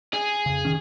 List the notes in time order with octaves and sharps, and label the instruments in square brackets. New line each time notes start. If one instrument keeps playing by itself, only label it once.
[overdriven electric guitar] G#4
[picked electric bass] F2 C#3
D1 D#3 C#4